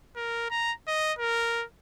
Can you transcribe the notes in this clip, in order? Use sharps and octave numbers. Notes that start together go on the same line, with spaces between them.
A#4
A#5
D#5
A#4